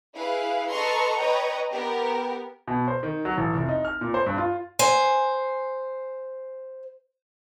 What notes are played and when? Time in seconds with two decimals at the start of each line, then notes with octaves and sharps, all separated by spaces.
0.17 E4 G#4 B4 F5 F#6
0.70 A4 B4 D#5 A#5 C6 C#6
1.18 B4 C#5 D#5 G5 A#5
1.73 B3 G4 A#4
2.67 B2
2.88 C5
3.03 D#3
3.25 F#3
3.37 A1
3.54 F1
3.69 D#4
3.85 F6
4.01 A#2
4.14 C5
4.26 G2
4.38 F4
4.79 C5 G#5